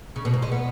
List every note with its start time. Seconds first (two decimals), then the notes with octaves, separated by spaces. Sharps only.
0.16 C#3
0.25 B2
0.34 G#2
0.42 G#3
0.52 B3